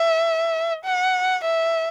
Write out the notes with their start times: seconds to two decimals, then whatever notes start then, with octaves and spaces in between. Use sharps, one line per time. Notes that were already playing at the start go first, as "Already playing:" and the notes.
Already playing: E5
0.85 F#5
1.44 E5